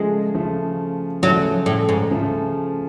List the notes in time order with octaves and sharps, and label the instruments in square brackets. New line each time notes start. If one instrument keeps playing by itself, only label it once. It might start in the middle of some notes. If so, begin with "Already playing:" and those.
Already playing: [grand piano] C#3 F3 A3 [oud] G#3
[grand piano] C#3 F3 A3
[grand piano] C#3 F3 A3 [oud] F#3
[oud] A2
G#2
[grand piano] C#3 F3 A3